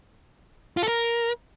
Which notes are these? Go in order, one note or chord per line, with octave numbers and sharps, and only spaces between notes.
F4
A4
A#4